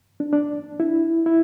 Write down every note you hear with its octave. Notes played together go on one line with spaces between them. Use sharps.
D4
D4
E4
E4